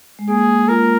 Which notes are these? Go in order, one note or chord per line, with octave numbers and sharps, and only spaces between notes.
G#3
A#3 G#4
F4 A#4